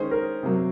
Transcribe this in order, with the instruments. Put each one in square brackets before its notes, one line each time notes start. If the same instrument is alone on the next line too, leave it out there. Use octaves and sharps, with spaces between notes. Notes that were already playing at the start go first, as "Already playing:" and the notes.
Already playing: [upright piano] D#3 G#3 C#4 G#4 [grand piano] C5
[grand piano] A#4
[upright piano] C3 F#3 A#3